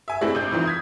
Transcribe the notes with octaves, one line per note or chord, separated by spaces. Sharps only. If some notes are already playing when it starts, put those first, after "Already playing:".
E5 G#5
G#3 A3 C4 D4 E4
G#1 D4 G6
F2 G#2 E3 F3
D#6 G#6 B6